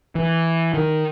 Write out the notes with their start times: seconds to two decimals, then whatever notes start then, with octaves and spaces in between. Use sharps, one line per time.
0.15 E3
0.74 D#3